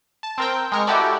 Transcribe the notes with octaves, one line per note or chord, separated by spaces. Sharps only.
A5
C4 A#4 G5
G#3 A#4 C#6
E4 F#4 G4 A4 D5